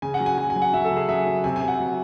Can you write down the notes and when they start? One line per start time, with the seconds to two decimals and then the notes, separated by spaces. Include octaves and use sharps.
0.02 C#3 G#5
0.14 F#5
0.20 F#3
0.26 G#5
0.38 F#3 G#5
0.50 G#5
0.56 F#3
0.62 F#5
0.74 F#3 E5
0.85 A4
0.91 C#3
0.97 G#4
1.08 F#3 E5
1.26 F#3
1.44 C3 G#5
1.56 G#5
1.61 C3
1.68 F#5
1.79 F#3